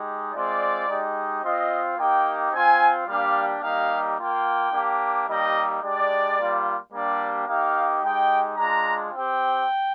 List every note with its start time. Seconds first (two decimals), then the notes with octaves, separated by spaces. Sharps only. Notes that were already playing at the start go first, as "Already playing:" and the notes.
Already playing: G#3 D#4 G4
0.32 G#3 C4 F4 D5
0.87 G#3 D#4 G4
1.42 C4 F4 D#5
1.97 A#3 D#4 G4 G5
2.52 C4 F4 G#5
3.07 G3 A#3 D4 G4 F5
3.62 G3 A#3 D#4 G4 F5
4.17 A#3 F4 G5
4.72 A#3 D4 G4
5.27 G3 A#3 D#4 G4 D#5
5.81 G#3 D4 G4 D5
6.37 G3 A#3 F4
6.92 G3 A#3 D4 G4 D5
7.47 A#3 D#4 G4 F5
8.02 G#3 D#4 G4 G5
8.57 G#3 D4 F4 A#5
9.12 C4 G4 G5